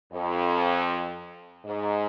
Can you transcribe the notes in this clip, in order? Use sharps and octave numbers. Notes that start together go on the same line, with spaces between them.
F2
G#2